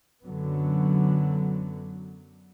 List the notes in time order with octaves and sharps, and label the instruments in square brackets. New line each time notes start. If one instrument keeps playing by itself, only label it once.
[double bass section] F#2 D3 F#3 B3